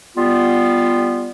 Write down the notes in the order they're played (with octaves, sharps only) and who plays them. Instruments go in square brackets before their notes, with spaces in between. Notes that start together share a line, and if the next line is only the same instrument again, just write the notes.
[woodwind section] G3 B3 F4